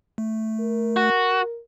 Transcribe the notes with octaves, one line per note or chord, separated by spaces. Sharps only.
A3
A#4
F#4